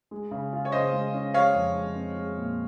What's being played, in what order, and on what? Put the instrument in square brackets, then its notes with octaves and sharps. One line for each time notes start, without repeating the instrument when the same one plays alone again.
[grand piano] G#3
C#3
F4
[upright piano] C#5
[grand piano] C#3 [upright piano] C5 D#5
[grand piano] G#3
C#4
[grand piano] G#3 [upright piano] C#5 F5
[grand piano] F2
G#3
C4
G#3
A#2